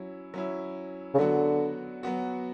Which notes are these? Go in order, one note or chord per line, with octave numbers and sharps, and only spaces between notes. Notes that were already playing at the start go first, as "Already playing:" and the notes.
Already playing: F#3 C#4 E4
F#3 C#4 E4
C#3
D3 F#3 B3 F#4
F#3 B3 F#4